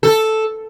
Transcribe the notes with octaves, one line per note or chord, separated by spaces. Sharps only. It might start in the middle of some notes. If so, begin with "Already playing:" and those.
A4